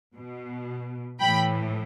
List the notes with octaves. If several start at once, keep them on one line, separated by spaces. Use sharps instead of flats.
B2
A2 E3 G5 B5